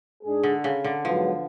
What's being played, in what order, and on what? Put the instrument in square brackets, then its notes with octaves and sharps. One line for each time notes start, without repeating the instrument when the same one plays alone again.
[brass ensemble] G#2 G#3 D4 G#4
[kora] D3
C#3
D3
[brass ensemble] G#2 F#3 B3 [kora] F3